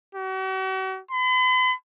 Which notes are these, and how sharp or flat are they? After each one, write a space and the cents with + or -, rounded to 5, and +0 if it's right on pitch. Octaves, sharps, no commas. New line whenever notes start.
F#4 +45
B5 +45